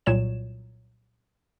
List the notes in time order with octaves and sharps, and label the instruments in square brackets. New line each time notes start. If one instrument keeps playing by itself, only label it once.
[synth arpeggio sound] C2 A#2 F#3 C#5 E7